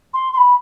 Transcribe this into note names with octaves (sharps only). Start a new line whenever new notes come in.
C6
C6
B5